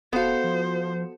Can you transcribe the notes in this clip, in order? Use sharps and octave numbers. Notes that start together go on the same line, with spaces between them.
D1 B3 F#4 A4 C5 F5
F3